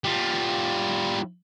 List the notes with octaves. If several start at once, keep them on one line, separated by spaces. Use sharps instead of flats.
G3 F4